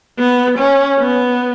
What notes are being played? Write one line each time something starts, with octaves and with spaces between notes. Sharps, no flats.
B3
C#4
B3